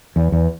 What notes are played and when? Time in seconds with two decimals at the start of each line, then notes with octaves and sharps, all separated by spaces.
0.16 E2
0.32 E2